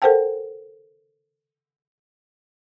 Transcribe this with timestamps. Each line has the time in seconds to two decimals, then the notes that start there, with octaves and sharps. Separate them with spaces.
0.02 A4 A#4 C5 F#5 G5 A5